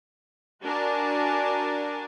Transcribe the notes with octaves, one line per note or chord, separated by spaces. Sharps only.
D4 F#4 A#4 G#5 A5